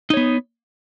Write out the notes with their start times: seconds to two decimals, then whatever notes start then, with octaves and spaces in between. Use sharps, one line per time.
0.10 D#4
0.14 C#5
0.17 B3